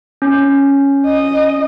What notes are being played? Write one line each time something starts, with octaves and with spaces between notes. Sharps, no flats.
C#4
D#5